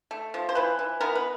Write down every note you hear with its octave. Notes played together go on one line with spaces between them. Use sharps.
A3
F3
C5
E3 B4
E3
B3 A#4
B4